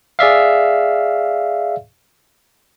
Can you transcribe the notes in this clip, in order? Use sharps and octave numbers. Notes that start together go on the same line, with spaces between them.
G#4 D5 E5 F5